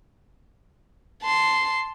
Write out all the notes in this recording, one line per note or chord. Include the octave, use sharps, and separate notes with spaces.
A5 C6